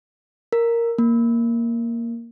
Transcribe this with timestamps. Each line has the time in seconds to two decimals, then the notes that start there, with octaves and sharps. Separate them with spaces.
0.53 A#4
0.98 A#3